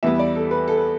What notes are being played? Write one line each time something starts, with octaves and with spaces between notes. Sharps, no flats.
E2 E3 G3 B3 E5
D5
A4
B4
A4
B4